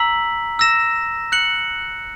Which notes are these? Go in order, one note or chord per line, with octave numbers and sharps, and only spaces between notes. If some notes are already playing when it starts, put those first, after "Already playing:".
Already playing: A#5 E6 B6 F#7
E6 A#6 E7
F#6 C#7 F#7